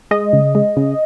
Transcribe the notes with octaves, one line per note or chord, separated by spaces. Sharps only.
G#3 D#5
C#3
G#3
C#3